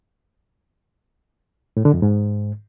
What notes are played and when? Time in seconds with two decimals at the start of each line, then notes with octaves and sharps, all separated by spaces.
1.77 A2
1.85 D3
1.94 F2
2.02 G#2